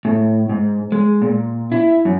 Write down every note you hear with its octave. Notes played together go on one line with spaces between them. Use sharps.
A2
G#2
G#3
A#2
E4
F#2